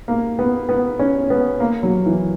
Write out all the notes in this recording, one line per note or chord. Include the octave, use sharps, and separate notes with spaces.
A#3
B3
B3
C#4
B3
A#3
F#3
E3